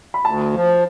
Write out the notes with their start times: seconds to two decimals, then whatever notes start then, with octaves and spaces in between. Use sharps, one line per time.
0.14 B5
0.25 D2 A5
0.53 F3